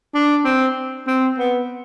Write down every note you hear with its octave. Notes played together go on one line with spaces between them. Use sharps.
D4
C4
C4
B3